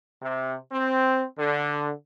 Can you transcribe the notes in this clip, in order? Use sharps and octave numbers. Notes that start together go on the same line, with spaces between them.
C3
C4
D3